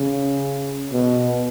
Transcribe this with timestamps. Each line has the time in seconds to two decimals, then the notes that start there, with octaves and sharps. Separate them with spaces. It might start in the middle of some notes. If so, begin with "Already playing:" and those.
Already playing: C#3
0.92 B2